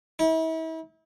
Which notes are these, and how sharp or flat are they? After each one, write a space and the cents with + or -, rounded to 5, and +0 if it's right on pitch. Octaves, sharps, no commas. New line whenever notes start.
E4 -40